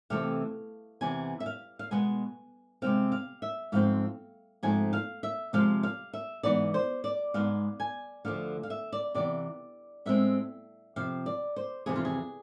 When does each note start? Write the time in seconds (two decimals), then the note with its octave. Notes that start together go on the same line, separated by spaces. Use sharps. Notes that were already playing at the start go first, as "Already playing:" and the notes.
0.10 C3 E3 A3 C4 F5
1.01 E2 C3 E3 G#5
1.40 E5
1.46 F5
1.79 F5
1.91 B2 G#3 B3 G#5
2.82 C3 G#3 C4 F5
3.12 F5
3.42 E5
3.72 G#2 F3 A3 C4 F5
4.63 G#2 F3 A3 C4 G#5
4.93 F5
5.23 E5
5.53 C3 F3 G#3 F5
5.83 F5
6.13 E5
6.43 G#2 E3 B3 D5
6.74 C5
7.04 D5
7.34 G#2 G#3 B3 F5
7.80 G#5
8.25 D2 D3 F3 F5
8.63 F5
8.70 E5
8.92 D5
9.15 C3 E3 B3 D5
10.06 A2 G#3 C4 E5
10.96 F2 C3 F3 F5
11.26 D5
11.56 C5
11.86 F2 C3 E3 G#4
11.96 F4
12.05 G#4